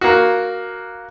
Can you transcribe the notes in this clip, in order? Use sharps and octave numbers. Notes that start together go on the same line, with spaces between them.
A#3 F#4